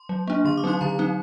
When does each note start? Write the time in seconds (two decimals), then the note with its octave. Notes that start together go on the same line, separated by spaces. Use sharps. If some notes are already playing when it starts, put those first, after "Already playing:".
Already playing: C6
0.09 F#3
0.28 A#3 D4
0.45 D3 C6
0.57 D6
0.64 F#3 C4 D#4 C6
0.81 D3 A#5
0.99 F#3 C4 D#4